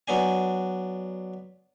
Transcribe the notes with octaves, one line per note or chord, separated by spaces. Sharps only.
F#3 B3 D4 G#5